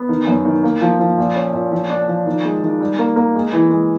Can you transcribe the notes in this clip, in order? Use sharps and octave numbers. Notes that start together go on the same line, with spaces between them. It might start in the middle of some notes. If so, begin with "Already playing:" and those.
Already playing: B3
D#3
F#2
D#3
A#3
F3
F3
A#2
C#4
A#2
F3
D4
F3
D#3
G#3
D#3
G3
A#3
A#3
G#3
E3
G#3